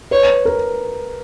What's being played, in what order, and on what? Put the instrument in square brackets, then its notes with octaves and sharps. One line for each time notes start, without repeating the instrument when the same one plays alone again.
[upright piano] B4 [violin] C#5
[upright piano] A#4